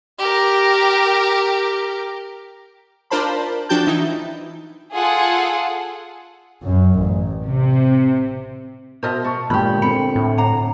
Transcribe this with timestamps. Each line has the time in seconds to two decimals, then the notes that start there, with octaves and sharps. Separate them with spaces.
0.19 G4 A#4
3.10 D4 F4 A#4 C5 A5 B5
3.69 F3 D4 F#4 G5 A5 G6
3.87 E3 D#4 E4
4.94 F4 G#4 A4 F#5
6.64 F#2
6.99 A1
7.45 C3
9.03 B2 C5 D#5 E5 A5 F6
9.24 A5 C#6
9.50 G1 A#2 G#3 G4 G#5 B5
9.82 D3 C4 B5 C#7
10.16 A2
10.38 D4 F#5 A#5